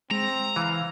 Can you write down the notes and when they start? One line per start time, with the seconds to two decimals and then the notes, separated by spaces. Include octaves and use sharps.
0.11 G#3 C4 A#5
0.56 E3 F5